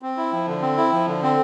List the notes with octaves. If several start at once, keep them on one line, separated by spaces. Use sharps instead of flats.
C4
E4
F3
D3
C4
E4
F3
D3
C4